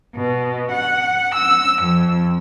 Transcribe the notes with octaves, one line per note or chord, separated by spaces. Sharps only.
B2
F#5
E6
F2